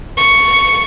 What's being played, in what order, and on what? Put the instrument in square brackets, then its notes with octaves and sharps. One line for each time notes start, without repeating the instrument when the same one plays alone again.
[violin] C#6 C#7